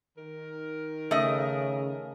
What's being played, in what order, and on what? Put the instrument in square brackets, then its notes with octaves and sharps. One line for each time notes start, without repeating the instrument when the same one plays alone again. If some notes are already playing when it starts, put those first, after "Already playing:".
[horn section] D#3 A#4
[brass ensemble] C#3 [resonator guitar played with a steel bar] A3 D#5